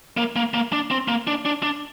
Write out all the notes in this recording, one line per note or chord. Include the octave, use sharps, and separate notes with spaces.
A#3
A#3
A#3
D4
C4
A#3
D4
D4
D4